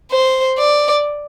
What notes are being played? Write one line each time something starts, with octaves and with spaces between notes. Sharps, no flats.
C5
D5